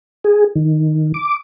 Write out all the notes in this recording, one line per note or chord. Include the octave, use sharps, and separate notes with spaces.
G#4
D#3
D6